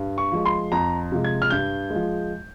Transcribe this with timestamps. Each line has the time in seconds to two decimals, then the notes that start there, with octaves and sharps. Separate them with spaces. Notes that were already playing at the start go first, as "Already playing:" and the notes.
Already playing: G2
0.18 C#6
0.32 F3 G#3
0.45 C6
0.72 F2 A#5
1.12 C3 F3 G#3
1.24 G#6
1.42 F6
1.50 G2 G6
1.90 G#3
1.95 F3